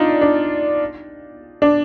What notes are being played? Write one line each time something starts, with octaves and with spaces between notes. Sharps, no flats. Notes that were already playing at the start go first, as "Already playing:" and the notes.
Already playing: D4 D#4 F4
D4
D4